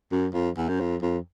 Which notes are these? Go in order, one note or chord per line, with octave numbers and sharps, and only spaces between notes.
F#2
F2
E2
F#2
F2
F2